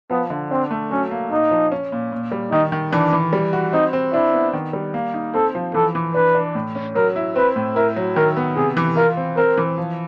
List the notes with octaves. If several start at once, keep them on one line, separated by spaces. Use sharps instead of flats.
F3 B3
D3
C4 D4
A3
F#3 C#4
A#3
A#2 D#4
F3
C#4
A#2
A#2
G3
D#3 D#4
D#3
E3 D4
E3
G3
F#4
C4 D#4
C4
D4 E4
B3
D#3
G3
A#3
D#4
C4 A4
F3
E3 A4
E3
D4 B4
D4
A2
C#4
F#3 A#4
E4
C4 B4
A2
E4 A#4
F#3
D#3 A#4
B3
C3 G#4
E3
F4 A#4
C4
C4 A#4
E3
F3